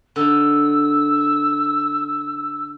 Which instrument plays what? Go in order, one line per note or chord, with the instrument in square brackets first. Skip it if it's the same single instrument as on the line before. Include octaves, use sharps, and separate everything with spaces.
[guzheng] D3 D#4 [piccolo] E6